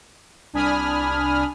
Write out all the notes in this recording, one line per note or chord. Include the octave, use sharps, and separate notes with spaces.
C2 D4 G#5 B5 D#6 F6